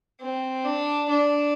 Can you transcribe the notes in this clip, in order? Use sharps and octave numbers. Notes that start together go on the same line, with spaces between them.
C4
D4
D4